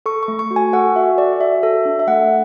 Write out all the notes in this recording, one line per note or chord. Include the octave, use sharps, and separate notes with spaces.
A4 C#6
C#6
A3
C#6
F#4
G#5
A4 F#5
F#4 E5
A4 D5
F#4 E5
A4
D4
E5
A3 F#5